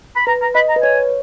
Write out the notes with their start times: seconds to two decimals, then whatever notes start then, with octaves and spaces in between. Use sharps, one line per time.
0.16 B5
0.27 B4 A#5
0.41 A#5
0.55 D#5 B5
0.69 A#5
0.76 B4
0.83 C#5 G#5